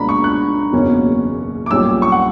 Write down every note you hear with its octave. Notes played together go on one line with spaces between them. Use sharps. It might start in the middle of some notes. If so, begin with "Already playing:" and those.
Already playing: C#2 B2 A#3 D4 A#5 B5
C#6
F#6
F#1 E2 B2 A#3 C#4
D6
B1 A#2 G3 C#4 E6
C#6
F#5